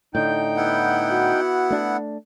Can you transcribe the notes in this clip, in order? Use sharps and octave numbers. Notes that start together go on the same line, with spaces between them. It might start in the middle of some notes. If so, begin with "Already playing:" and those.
A2 D3 D#4 G5 G6
B3 E4 F#5
F#4
A3 D4